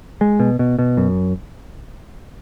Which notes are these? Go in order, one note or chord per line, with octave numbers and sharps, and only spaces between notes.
G#3
B2
B2
B2
F#2